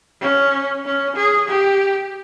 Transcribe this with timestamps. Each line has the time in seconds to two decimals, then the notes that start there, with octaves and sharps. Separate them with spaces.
0.21 C#4
0.85 C#4
1.16 G#4
1.48 G4